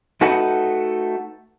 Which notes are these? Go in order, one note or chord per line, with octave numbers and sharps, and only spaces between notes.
A3 D#4 F#4 A4 B4 F#5